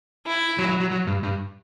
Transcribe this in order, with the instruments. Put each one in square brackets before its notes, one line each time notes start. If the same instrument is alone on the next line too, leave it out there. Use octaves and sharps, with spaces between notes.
[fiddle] E4
[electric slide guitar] F#3
F#3
F#3
F#3
G2
G2